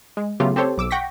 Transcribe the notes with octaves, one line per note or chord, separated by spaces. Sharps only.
G#3
C#3 F#3 A3 B3 F4 G4
C4 G4 A4 C5 C#5
B1 D6 E6
F#5 G5 C#6 A#6 B6